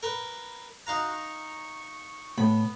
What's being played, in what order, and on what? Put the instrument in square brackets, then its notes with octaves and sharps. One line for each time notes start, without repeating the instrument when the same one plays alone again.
[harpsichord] A#4 B4
[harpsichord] D#4 F5 A#5 [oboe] F#4
[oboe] C#6
[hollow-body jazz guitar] A2 [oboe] B3 [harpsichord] B5